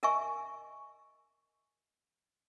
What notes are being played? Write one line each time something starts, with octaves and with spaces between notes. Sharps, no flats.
A#4 D#5 E5 G#5 C#6